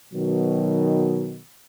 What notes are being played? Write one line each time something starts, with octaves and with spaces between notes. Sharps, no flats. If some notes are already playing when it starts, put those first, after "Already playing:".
B2 D#3 F#3